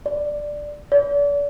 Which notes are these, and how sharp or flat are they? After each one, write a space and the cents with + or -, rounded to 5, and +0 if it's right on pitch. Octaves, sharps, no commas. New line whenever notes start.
D5 +5
D5 -40